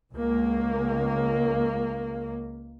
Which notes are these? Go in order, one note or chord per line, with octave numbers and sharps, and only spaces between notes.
C#2 A#3